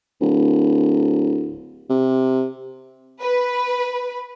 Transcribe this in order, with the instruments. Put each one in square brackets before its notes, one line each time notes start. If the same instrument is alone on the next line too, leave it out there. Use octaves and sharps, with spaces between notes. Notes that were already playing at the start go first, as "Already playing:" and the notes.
[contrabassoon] D1
C3
[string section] B4